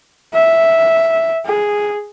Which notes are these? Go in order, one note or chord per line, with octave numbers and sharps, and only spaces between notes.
E5
G#4